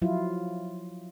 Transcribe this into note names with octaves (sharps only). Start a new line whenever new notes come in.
F3 F#3 E4 F4